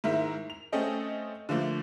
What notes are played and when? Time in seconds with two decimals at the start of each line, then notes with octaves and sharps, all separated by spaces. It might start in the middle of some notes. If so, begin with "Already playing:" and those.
0.04 G#2 D#3 E4 A#4 E5
0.50 F7
0.72 A3 C4 C#4 A4 D#5 G5
1.49 D3 F3 A3 A#3